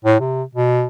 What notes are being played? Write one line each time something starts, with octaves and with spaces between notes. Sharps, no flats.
A2
C3
B2